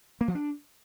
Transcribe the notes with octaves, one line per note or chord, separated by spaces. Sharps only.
A#3
F3
D4